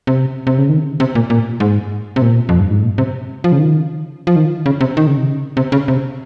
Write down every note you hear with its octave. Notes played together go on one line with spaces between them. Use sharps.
C3
C3
C#3
D#3
C3
A#2
A#2
G#2
C3
A#2
F2
G2
G#2
A#2
C3
F3
C#3
D#3
F3
D#3
C#3
C3
D#3
C#3
C3
C#3
C3
C#3
C3